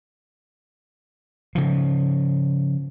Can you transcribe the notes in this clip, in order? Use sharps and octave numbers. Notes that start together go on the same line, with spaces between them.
C#3 F3